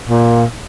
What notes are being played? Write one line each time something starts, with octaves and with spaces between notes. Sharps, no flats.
A#2